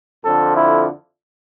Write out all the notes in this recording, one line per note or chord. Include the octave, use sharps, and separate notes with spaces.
F2 D3 F3 A4
E4